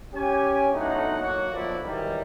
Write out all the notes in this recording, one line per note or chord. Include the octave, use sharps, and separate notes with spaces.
C#4 G4 G#5
B1 A2 D3 D#4 F#5
F#3 A#3 F#4
B1 F3 A3 A#3 E4 D5
D#3 E3 F#3 G3